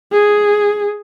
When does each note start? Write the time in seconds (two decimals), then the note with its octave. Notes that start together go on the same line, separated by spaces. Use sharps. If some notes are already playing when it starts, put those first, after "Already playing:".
0.12 G#4